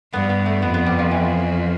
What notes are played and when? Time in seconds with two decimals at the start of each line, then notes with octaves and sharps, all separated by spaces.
0.13 G2 B3
0.29 B3
0.46 A3
0.62 F2 B3
0.74 B3
0.86 G3
0.99 F3
1.11 E3